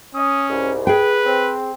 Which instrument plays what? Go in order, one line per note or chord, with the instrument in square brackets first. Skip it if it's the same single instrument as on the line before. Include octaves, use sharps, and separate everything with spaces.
[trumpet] C#4 [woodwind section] D#6
[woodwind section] C2 G#2
[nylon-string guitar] G#4 G5 [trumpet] B4
[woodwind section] C4